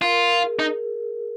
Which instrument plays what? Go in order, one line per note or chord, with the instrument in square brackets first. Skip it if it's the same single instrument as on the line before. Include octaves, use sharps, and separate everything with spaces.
[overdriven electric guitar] F4 [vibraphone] A#4
[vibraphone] G#4
[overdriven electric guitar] D#4